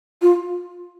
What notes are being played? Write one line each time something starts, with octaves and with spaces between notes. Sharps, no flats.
F4